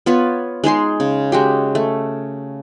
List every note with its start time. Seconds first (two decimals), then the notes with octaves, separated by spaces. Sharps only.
0.06 B3 F4 B4 C#5
0.64 G#3 D#4 G#4 C6
1.00 C#3
1.32 G#3 F#4 G4
1.75 A3